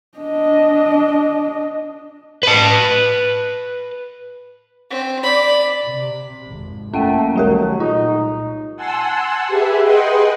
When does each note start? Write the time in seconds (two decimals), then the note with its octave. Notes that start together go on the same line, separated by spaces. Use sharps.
0.18 D4 D#5
2.43 B4 A5
4.91 C4
5.23 D5 B5
5.87 C3
6.47 G#1 F2
6.93 F1 A3 A#3 C#4 F#5 G5
7.36 C2 D#3 F#3 G3 A3 G4 A#4
7.80 A#2 D#4 F4
8.76 F#5 G#5 A5 C6 E6
9.48 G4 G#4 B4 E5
9.81 G#4 B4 D#5 F#5 G5 C6